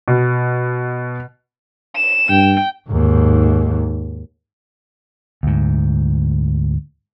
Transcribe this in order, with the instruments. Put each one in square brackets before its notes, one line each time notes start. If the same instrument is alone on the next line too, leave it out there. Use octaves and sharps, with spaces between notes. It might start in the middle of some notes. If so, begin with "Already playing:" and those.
[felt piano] B2
[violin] E7
[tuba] G2 [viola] G5
[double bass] D#2 G#2
[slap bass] D2 G#2